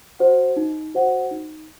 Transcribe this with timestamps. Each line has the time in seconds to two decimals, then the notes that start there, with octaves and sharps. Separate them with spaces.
0.19 F#4 C5 F#5
0.57 D#4
0.94 F#4 C5 F#5
1.31 D#4